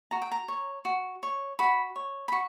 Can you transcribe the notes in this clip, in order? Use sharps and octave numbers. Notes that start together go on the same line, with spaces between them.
F#4 A#5
G5
A#5
C#5
F#4
C#5
F#4 B5
C#5
B5
F#4 C#6